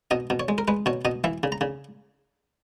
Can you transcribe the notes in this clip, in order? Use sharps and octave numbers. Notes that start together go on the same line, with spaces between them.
B2 D#5
B2
C#5
G#3
A#4
G#3 B4
B2 C#5
B2 D#5
E3 E5
C#3
A#5
C#3